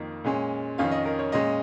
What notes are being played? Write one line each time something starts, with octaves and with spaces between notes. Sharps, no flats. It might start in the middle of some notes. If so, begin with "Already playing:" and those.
Already playing: F2 D#3 A#3
A#2 G#3 C#4
F2 D#3 C#4 F5
D#5
A#4
C#5
A#2 G#3 C#4 D#5